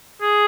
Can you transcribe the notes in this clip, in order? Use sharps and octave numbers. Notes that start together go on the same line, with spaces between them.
G#4